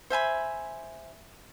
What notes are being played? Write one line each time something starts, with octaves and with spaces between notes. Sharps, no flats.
C5 E5 G#5 B5